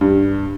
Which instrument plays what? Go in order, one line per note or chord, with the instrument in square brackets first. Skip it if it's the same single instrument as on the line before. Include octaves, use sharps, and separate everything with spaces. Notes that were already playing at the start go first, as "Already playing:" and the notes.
[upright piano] G2